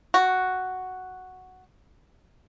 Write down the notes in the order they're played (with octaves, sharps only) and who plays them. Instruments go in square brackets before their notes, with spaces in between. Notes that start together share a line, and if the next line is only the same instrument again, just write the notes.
[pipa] F#4